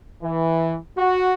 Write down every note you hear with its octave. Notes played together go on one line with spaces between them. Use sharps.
E3
F#4